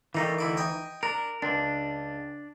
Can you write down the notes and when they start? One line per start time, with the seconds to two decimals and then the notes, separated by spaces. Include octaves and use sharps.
0.15 E3 G3 A3 A#3 D#4
0.39 D2 E4 D6
0.57 D#5 G5 G#5
1.03 D4 A#4
1.42 C#2 D4